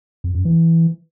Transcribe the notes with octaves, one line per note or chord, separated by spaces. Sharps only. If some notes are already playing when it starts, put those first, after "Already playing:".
F2
F#2
E3